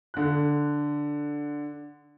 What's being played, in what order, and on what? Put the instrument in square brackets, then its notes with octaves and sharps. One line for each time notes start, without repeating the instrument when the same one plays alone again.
[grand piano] D3 F#6